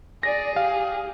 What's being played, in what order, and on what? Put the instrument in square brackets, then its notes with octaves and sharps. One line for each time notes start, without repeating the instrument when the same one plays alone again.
[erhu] G#4 [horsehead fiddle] D5 [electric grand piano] A#6
[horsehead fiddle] G4 [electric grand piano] F5